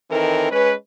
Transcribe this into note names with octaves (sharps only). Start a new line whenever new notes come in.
D#3 E3 C4 A4 A#4
G#3 C#4 B4